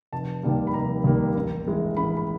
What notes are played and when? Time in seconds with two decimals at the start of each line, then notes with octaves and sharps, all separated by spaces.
0.12 F1 A5
0.43 D#2 D#3 G3 A#3
0.67 B5
0.74 F1 A#5
1.04 D#2 D#3 G3 A#3
1.36 A1
1.66 G2 E3 G#3
1.97 A1 B5
2.17 B5